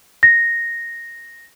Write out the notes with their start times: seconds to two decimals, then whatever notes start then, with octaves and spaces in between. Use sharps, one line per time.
0.23 A#6